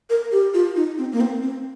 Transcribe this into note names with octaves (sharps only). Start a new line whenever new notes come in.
A#4
G4
F4
D#4
C4
A#3
C4
C4